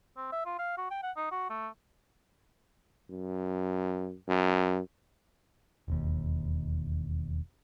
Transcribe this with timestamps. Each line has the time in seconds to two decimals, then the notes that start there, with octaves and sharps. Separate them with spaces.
0.17 C4
0.32 E5
0.46 F4
0.59 F5
0.78 F#4
0.91 G5
1.03 F#5
1.17 D#4
1.32 F#4
1.50 A3
3.10 F#2
4.28 F#2
5.88 E1 D#2